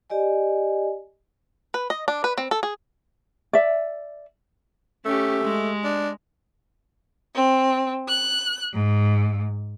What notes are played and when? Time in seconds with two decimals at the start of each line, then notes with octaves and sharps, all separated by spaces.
0.10 G4 D5 D#5 G#5
1.74 B4
1.90 D#5
2.08 D4
2.24 B4
2.38 C4
2.51 A4
2.63 G#4
3.53 D5 E5
5.05 A3 C#4 G4
5.45 G#3
5.84 D4
7.34 C4
8.07 F#6
8.73 G#2